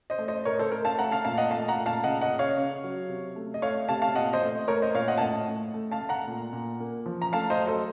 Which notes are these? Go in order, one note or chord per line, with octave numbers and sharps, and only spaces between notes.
C5 D#5
A3
C5 D#5
A2 A#4 C#5
A4 C5
A3 A#4
F5 A5
A3 F#5 A#5
F5 A5
A#2 F5 A5
D#5 F#5
A3 F5 A5
F#5 A#5
A#2
F5 A5
C#3 D#5 F#5
D#5 F#5
C#3
C#5 F5
C#3
F#3
C3
A3
D#5
A3 C#5 F5
C3 F5 A5
F5 A5
A#2 D#5 F#5
C5 D#5
A3
A3 A#4 C#5
C5 D#5
A#2 C#5 F5
D#5 F#5
A5
A2 D#5 F#5
A3
A3
F5 A5
A3
F#5 A#5
A#2
A#2
A#3
F3
A#5
A3 F5 A5
C5 D#5
F#3
A4 C5